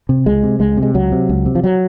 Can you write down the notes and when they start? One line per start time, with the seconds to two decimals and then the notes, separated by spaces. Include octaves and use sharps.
0.09 C3
0.26 C#2 G#3
0.43 C3
0.60 C#2 G#3
0.77 C3
0.83 G#3
0.94 C#2 F#3
1.12 C3
1.29 C#2
1.46 C3
1.55 F3
1.64 F#3